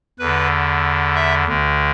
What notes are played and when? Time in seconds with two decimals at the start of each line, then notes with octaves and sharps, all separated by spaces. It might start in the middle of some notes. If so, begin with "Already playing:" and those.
0.19 E2 D3 B4
1.15 E5
1.48 D2 D3